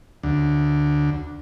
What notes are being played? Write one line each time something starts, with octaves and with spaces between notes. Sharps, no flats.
D2